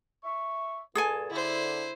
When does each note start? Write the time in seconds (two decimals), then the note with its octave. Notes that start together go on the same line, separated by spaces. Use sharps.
0.24 E5 C#6
0.95 G2 A#2 G#4 A4 G#5
1.31 D3 E4 C5